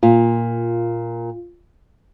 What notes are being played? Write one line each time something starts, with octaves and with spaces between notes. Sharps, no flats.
A#2 F4